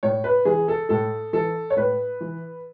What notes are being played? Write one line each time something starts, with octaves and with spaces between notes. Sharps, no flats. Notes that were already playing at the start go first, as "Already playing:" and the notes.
A2 C#5
B4
E3 G#4
A4
A2 A4
E3 A4
C#5
A2 B4
E3